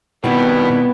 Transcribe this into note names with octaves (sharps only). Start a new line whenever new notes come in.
B2 D#3 G3 B3 C4 E4